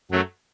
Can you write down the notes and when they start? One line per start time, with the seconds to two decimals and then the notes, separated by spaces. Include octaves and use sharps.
0.11 F#2 F#3 A3